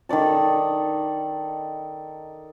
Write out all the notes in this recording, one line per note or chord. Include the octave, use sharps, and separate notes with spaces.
D#3 A4 D5 A5